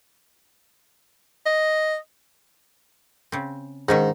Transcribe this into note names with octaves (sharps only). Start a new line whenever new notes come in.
D#5
C#3 C4
G#2 D#3 C#4 D#4